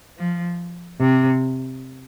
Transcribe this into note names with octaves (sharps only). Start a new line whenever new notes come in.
F3
C3